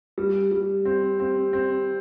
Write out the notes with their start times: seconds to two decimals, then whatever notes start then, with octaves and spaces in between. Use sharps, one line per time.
0.18 G3
0.51 G3
0.85 C4
1.20 C4
1.53 C4